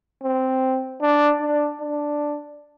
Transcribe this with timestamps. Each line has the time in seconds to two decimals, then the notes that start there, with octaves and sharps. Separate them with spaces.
0.23 C4
1.02 D4
1.41 D4
1.81 D4